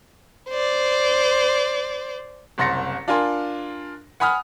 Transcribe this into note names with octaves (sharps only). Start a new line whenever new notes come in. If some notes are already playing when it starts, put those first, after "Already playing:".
C5 D5
F#1 C2 C6 A6 A#6 C#7
D4 F4 A#4 G#5 C6
F#5 G#5 B5 D#6 F6